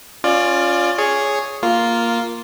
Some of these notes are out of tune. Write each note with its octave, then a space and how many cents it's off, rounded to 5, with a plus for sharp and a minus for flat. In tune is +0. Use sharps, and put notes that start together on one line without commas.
C#4 +0 F4 +5 D5 +25
G#4 +0 C#5 +0
A#3 +0 F4 +0